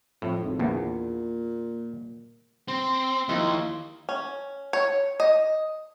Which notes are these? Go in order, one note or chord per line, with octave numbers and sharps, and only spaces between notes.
F2 A2
G#1
A#1 E2 A#2
C4 C6
D#2 D#3 F3 E4
C#4
C#5
D#5